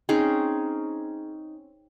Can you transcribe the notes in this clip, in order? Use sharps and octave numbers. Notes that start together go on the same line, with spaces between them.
C4 C#4 D#4 G#4